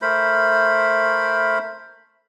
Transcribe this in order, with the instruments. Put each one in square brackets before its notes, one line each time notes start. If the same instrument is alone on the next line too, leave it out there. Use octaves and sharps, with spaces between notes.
[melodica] A3 A#4 C5 B5